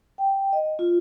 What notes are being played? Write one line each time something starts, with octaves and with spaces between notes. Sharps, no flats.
G5
D#5
F4